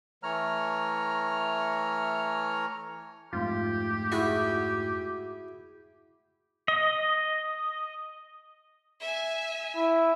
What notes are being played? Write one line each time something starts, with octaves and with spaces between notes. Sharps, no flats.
E3 A3 C#5 A#5 F6
F2 G#2 A3 F4 G4
E4 F#4 G#4
D#5
E5 G#5
E4